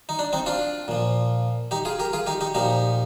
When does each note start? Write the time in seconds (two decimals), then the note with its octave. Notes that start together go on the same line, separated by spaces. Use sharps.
0.09 D#4
0.19 D4
0.33 C4 D#4
0.46 D4 F4
0.88 A#2 F3
1.71 D#4 G4
1.85 F4 G#4
1.99 G4 A#4
2.13 F4 G#4
2.27 D#4 G4
2.41 D#4 G4
2.54 A#2 F3 D#4 G4